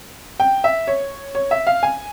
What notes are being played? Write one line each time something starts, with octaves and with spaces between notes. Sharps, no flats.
G5
E5
C#5
C#5
E5
F5
G#5